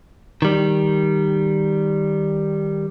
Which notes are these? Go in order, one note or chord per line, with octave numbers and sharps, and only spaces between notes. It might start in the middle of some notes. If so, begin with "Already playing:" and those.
D#3 G3